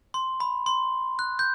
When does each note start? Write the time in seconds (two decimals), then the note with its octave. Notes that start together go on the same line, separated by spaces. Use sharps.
0.14 C6
0.40 B5
0.66 C6
1.19 F#6
1.39 G6